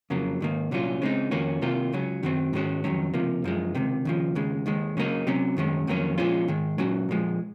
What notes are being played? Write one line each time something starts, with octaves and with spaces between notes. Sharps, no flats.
F2 C#3 F#3 A#3
G#2 D#3 A#3
C2 A#2 F#3 C#4 F4
C#3 G#3 C4 D#4
F2 D#3 A#3 C#4 F#4
C2 C3 D#3 A#3 F4
C#2 C#3 F#3 C#4
F#2 D#3 F#3 C4
G#2 D#3 G#3 C#4 F#4
F2 D#3 F#3 C#4
C#2 C3 F3 A#3
F#2 F3 G#3
C#2 C3 D#3
D#2 C#3 F3
D#2 C#3 G#3
D#2 D#3 G#3
C#3 F#3 A#3 D#4
C3 F#3 C#4
F#2 D#3 G#3 C#4
F2 D#3 F#3 A#3 C#4
A#2 F3 G#3 C#4 F4
G#2 D#3 G#3
A#2 F#3 C#4 F#4
A#2 F3 G#3